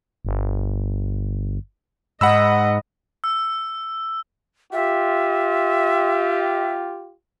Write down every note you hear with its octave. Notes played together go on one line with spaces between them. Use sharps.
G1
G#2 D#5 F#5 B5 E6
E6
F4 G4 E5